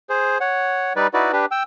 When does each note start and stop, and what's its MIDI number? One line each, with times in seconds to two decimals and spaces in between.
0.10 0.38 68
0.10 0.38 72
0.41 0.93 73
0.41 0.93 78
0.96 1.07 55
0.96 1.07 63
0.96 1.07 71
0.96 1.07 74
1.14 1.32 63
1.14 1.32 64
1.14 1.32 66
1.14 1.32 71
1.14 1.32 74
1.33 1.46 62
1.33 1.46 67
1.33 1.46 71
1.51 1.63 79
1.51 1.63 88